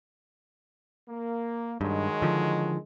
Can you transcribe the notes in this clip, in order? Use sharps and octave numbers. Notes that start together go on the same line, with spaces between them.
A#3
G2 D#3 F#3 G#3
D3 F3